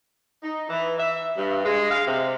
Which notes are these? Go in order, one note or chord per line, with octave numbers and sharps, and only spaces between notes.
D#4
E3
E5
G2
G#3
F5
C3